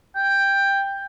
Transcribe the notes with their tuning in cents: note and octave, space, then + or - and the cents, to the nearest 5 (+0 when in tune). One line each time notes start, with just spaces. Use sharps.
G5 +10